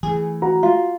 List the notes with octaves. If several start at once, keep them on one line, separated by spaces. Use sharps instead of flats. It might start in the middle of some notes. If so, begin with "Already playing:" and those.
E3 A3 G#4
F#4 A#5
F4